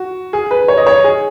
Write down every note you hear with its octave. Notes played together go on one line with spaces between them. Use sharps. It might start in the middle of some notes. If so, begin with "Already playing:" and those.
Already playing: F#4
G#4
B4
C#5
D#5
C#5
G#4